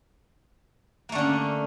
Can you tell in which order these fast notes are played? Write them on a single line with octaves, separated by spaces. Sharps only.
A#3 A3 D3 C#4